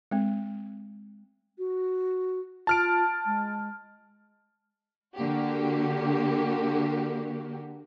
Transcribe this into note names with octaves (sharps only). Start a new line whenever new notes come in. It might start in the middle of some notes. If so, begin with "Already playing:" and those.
G#3 C4
F#4
F4 A5 F6 D7
G#3
D3 A#3 F#4 G4